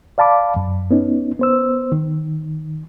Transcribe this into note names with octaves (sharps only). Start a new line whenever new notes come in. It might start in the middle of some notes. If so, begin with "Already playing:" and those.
D5 F5 A5 B5 D6
F#2
B3 C#4 D#4
B3 C5 E6
D#3